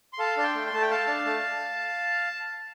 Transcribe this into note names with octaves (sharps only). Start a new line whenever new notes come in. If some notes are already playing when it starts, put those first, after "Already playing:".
C6
A4 F5 A5
D4 A5
G5 C6
A3
C6
A3 A5
G5
A4 F5 A5
D4
A3